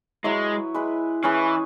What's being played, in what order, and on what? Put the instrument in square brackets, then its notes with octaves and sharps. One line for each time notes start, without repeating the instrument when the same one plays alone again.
[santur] F#3 E4 B4 E5 [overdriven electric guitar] G#3
[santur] G#3 E4 B4
[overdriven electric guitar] E3 [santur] C#4 G#4 B4